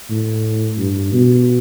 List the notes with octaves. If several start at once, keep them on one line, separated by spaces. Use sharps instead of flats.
A2
G2
B2